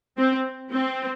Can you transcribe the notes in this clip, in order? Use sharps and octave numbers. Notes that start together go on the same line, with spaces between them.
C4
C4